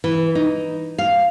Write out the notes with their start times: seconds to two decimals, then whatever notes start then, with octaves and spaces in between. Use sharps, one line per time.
0.04 E3
0.35 D#4
0.98 F5